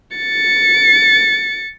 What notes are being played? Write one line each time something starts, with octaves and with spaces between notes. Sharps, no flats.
A6 C#7